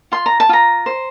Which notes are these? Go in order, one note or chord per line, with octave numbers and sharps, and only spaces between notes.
F4 C6
A#5
A5
F4 A#5
C5